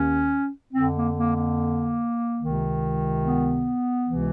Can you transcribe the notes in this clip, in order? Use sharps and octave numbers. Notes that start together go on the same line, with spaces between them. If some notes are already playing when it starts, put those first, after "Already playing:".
Already playing: D#2 D#3 C#4
F2 D3 C4
A#3
A#3
A#3
C#2 C3 D#3
B3
C#2 C3 E3